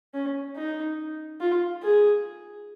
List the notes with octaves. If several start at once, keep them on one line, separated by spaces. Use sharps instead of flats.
C#4
D#4
F4
G#4